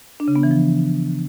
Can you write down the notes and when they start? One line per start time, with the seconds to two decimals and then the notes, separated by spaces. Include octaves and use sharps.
0.20 D4
0.28 C#3
0.36 B3
0.43 E3
0.51 F3